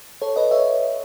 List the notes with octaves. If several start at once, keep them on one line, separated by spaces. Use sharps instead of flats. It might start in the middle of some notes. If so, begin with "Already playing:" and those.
A4 C#5
B4 D#5
C#5 E5